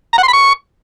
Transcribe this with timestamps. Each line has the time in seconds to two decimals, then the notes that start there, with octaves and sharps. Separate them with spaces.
0.13 A#5
0.18 F#5
0.23 C6
0.28 B5
0.33 C#6